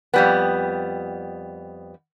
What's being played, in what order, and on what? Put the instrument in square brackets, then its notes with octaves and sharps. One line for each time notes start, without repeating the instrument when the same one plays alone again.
[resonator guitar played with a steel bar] F2 G3 B3